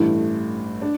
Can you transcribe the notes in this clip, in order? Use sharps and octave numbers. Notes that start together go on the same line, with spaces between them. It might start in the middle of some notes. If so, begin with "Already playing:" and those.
Already playing: A1 G2 E3 A3 E4
D4